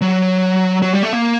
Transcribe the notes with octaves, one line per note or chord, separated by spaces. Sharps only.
F#3
F#3
G3
A3
A#3